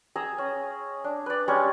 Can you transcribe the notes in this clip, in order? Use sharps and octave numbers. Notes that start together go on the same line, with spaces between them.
G#4 D#5 A#5 E6
C#4
D4
B4 D5
G3 G#3 C#4 C#6